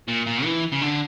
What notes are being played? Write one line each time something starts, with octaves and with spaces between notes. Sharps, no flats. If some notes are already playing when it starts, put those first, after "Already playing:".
A#2
A#2
E3
C#3
D3